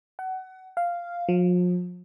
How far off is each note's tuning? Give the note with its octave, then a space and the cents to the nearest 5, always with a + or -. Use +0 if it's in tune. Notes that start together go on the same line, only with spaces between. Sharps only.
F#5 +25
F5 -5
F3 +40